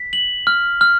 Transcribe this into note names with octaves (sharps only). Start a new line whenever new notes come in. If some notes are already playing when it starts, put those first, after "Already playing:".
Already playing: B6
F#7
F6
F6